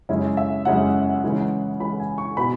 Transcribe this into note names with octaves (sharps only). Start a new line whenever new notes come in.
F#2 C#3 G#3 C#4 E4
E5
F#2 C#3 G#3 C#4 E4 F#5
C#3 E3 G#3 C#4 E4
C#3 E3 G#3 C#4 E4 B5
G#5
C#6
B2 B3 E4 B5